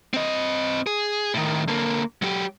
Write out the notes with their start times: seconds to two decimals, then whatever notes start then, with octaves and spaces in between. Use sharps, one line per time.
0.14 C4 D#5
0.87 G#4
1.34 A2 D#3
1.68 D3 A#3
2.22 F#3 G4